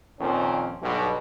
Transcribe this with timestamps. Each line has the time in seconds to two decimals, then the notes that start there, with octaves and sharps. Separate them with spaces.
0.20 F2 A#2 D#3 C4 C#4 C5
0.82 B1 G2 B2